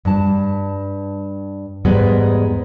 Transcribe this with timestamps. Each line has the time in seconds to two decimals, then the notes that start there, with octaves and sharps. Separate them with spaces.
0.05 G2 A5
1.85 E2 G#2 G3 G#3 B3 B4